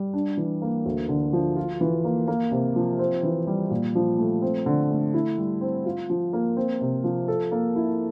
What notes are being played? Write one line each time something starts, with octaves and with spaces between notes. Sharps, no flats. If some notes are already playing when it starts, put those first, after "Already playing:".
Already playing: G3
D4
E3
A#3
D2
D3
F3
F4
E3
A#3
A#3
C3
F3
C4
E3
G3
A#2
F3
A3
C4
D3
A3
E4
G3
C4
F4
F3
A#3
C4
C3
F3
A4
A#3
E4